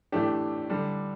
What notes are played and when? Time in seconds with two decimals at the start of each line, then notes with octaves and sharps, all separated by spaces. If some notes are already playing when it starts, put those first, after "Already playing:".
0.12 A2 E3 A3 D4 G4
0.69 D3 G3 D4